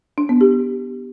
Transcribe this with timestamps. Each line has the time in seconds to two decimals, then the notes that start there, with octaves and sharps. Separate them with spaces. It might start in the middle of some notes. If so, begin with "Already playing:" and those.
0.18 D4
0.29 B3
0.41 G4